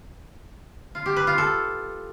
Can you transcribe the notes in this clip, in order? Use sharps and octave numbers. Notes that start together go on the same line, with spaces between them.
F4
G4
B4
F4
A4